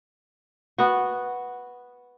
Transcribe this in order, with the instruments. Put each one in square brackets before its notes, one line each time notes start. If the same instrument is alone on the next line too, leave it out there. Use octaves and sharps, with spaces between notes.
[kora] B3 F#4